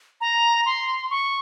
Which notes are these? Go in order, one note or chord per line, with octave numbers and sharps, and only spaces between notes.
A#5
C6
C#6